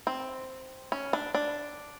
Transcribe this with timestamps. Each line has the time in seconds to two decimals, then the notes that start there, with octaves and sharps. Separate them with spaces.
0.07 C4
0.92 C#4
1.13 D4
1.35 D4